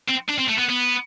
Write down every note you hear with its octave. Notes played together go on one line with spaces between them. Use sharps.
C4
D4
C4
A3
B3
B3